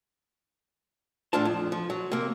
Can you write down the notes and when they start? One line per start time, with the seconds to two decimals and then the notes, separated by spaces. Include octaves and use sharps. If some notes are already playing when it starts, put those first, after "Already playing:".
1.33 E2 A2 D4 F4 A5
1.45 F2
1.72 F3
1.90 F#3
2.12 C3 A#3